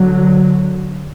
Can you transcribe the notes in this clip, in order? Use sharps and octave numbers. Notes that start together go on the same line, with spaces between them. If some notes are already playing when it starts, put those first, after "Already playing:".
Already playing: D3 F#3